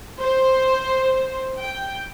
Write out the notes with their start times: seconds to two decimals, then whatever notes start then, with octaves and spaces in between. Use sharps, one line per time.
0.21 C5
1.59 G5